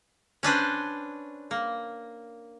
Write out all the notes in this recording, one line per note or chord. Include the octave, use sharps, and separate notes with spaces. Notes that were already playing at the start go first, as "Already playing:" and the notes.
C#4 D4 B4 C5
A#3